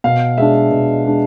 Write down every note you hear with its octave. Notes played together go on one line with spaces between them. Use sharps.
B2 F5
G#3 D4 E5
B2
G#3 D4